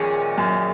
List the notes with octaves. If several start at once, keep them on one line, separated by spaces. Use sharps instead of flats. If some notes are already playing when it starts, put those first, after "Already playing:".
Already playing: A#1 A#2 D#3 G#3 C#4
F#2